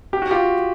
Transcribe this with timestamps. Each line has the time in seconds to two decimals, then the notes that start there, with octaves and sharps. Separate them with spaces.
0.13 G4
0.22 F#4
0.31 F4 G4